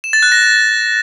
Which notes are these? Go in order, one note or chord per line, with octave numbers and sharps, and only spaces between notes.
E7
A6
F#6
A#6